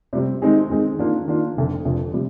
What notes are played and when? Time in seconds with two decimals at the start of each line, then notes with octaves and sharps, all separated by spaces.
0.13 C3 G3 C4
0.42 D#3 G#3 C4 D#4 G#4
0.70 D#3 G#3 C4 D#4 G#4
0.99 D#3 A#3 D4 F4
1.27 D#3 A#3 D4 F4
1.56 F1 F2 D3
1.85 F1 F2 D3
2.14 C3 G3